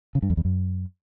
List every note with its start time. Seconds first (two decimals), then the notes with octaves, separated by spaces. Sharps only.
0.15 C#3
0.22 G2
0.30 F2
0.37 E2
0.45 F#2